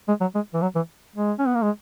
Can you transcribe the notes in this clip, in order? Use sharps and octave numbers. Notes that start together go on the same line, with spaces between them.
G#3
F#3
G#3
E3
F#3
E3
G#3
C#4
B3
A#3
G#3